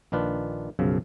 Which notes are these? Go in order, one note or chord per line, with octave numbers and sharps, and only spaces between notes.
A#1 D#3 D4 F4 B4
B1 F#2 C#3 F3